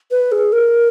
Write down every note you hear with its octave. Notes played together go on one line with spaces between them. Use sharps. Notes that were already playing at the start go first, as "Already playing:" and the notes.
B4
G#4
A#4